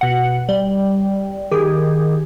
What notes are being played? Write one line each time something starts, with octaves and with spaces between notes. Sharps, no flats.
B2 F#5
G3
D#3 G4 G#4